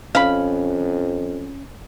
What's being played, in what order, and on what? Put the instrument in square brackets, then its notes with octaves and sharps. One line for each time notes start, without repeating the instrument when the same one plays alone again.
[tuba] F2 [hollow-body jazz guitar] C#4 [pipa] F5 B5